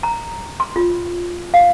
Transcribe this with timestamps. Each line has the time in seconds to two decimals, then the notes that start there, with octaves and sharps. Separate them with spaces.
0.03 A#5
0.60 C6
0.76 F4
1.54 F5